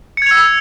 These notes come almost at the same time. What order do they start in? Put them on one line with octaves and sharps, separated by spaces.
C#7 G#6 F7 E6